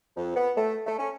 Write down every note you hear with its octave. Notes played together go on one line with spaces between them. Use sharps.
F2
B3
A3
A3
C#4